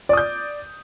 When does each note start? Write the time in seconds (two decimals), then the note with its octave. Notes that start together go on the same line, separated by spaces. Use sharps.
0.09 D5
0.13 D#6
0.17 G6